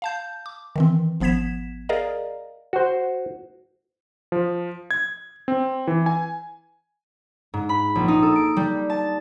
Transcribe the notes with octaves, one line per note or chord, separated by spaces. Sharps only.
F5 A5 G6
D6
D#3 E3 C4
G#1 F3 B3 G#6 B6 E7
G#4 A#4 D5 D#5 F5 A#5
F#4 C5
F3
G#6
C4
E3
G#5
G#2
B5
A#1
D#4
A4
D7
G3
A5